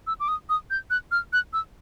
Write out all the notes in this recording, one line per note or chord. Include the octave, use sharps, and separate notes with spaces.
E6
D6
D#6
D#6
G6
F#6
F6
F#6
E6